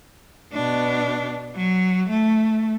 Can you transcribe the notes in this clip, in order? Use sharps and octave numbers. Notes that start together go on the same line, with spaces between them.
B2 D4
F#3
A3